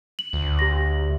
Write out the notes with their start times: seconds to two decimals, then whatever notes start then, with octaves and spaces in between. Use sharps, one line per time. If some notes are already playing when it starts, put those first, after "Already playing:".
0.19 F#7
0.33 D2
0.59 G4 A#6